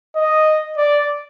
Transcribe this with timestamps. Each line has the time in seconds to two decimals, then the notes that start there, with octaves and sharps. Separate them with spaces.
0.15 D#5
0.77 D5